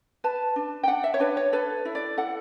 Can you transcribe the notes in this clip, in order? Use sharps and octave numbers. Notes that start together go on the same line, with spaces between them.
B4 A5
D4
G5
D4 F#5
E5
C#5
D4 B4
C#5
A4 B4
E4
D5
A4 F#5